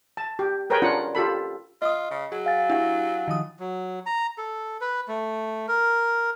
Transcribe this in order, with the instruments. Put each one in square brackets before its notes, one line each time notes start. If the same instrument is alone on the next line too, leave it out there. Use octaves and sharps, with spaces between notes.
[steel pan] A5
G4
G#4 A#4 B4 C#5 G5
C#4 D4 F4 F#5
F4 G4 A4 B5
[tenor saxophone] F4 [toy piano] D#5 D#6
[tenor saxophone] C#3
[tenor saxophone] F#3 [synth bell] G#4
[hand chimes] F5 G#5 A6
[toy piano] D4 G4 F#5 [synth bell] E4
[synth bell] D#3 F3 D#6
[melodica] F#3
A#5
A4
B4
A3
A#4